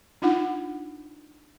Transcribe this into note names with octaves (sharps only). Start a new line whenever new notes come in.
D4 D#4 F4 F#5